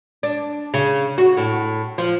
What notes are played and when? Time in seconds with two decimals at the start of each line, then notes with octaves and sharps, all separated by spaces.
0.23 D4
0.74 C#3
1.18 F#4
1.37 A2
1.98 F3